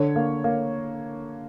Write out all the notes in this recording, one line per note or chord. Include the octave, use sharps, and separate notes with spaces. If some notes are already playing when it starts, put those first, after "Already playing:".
Already playing: D3 C#5
A#3
A#3